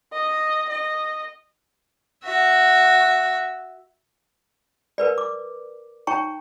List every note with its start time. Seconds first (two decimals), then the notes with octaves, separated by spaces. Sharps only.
0.13 D#5
0.69 D#5
2.24 F#4 E5
4.98 A#4 B4 D5
5.18 D6
6.07 D#4 C#5 G5 A#5 C#6